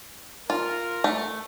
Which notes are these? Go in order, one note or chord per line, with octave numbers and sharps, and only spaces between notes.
F4 A#4
A3